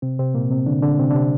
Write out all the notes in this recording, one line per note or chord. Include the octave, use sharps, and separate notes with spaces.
C3 C4
C3 C4
A#2 A#3
C3 C4
D3 D4
D3 D4
C3 C4
D4
C3 C4